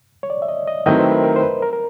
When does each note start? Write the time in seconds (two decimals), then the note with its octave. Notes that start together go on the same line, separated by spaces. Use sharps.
0.23 C#5
0.30 D5
0.42 E5
0.49 D#5
0.67 D#5
0.86 D#3 F#3 A3 C4 E4 D#5
0.94 B4
0.99 C5
1.06 A#4
1.11 B4
1.24 A#4
1.36 C5
1.42 B4
1.62 A#4
1.73 A#4